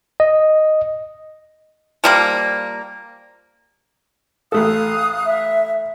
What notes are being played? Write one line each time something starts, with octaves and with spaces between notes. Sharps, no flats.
D#5
F3 G3 A#3
A1 A3 A4 F5 D#6 F#6
E5